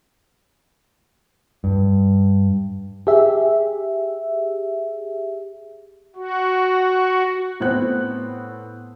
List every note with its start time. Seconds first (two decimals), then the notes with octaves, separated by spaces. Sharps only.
1.64 G2
3.07 G4 G#4 E5
6.16 F#4
7.60 A2 B3 C4 F#6